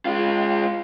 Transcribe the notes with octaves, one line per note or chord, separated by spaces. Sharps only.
G#3 F4